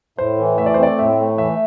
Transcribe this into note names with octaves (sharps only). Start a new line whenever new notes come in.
A2 C5
E3
A3 E5
D5
C5
C4 D5
A2 E5
A3
E3 E5